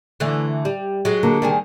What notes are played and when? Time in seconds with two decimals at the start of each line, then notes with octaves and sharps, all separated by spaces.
0.20 D3 E3 A3
0.65 G3
1.05 F#3 G#3
1.23 D3 A#3
1.42 D#3 G3 G#4